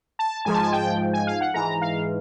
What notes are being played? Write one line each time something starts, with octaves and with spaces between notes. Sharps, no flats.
A5
G#2 F3 G#3 G#5
A5
G#5
G5
G#5
F5
F#5
G#2 E3 G#3 A#5
F5